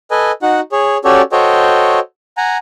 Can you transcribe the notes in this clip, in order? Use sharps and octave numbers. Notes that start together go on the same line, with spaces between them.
A4 B4 D#5 G#5
D#4 F#4 F#5
G#4 C#5
C#4 F#4 G4 A4 C#5 D5
F#4 A4 C5 C#5 D#5 G5
F#5 G#5 A#5